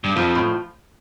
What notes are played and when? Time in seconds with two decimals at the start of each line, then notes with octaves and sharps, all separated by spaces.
0.04 G2
0.16 F2 F3
0.35 A2